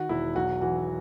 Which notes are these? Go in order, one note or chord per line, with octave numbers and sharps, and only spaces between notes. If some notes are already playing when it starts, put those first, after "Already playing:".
Already playing: D#3 F#4
E1 E4
B1 F#4
E3 F#4